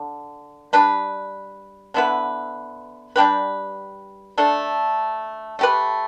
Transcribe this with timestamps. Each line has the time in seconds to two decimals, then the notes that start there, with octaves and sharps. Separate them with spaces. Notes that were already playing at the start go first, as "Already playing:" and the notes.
Already playing: D3
0.73 G3 D4 B4
1.94 D3 B3 E4 B4
3.16 G3 D4 G4 B4
4.38 A3 D4 A4
5.59 A3 G4 B4